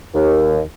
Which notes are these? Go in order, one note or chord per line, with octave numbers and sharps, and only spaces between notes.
D#2